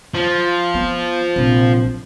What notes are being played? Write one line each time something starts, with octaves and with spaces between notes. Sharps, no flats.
F3
B3
A#1 C3